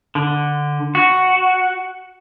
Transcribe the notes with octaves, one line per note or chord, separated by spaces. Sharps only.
D3
F#4